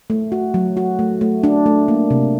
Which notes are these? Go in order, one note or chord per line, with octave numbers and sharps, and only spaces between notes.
A3
F#4
F#3
F#4
A3
A3
D4
A3
A#3
C3